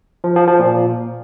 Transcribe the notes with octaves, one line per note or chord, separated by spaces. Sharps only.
F3
F3
F3
A#2